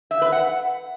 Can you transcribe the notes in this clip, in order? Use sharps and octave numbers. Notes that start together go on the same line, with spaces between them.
E5
B4
F#5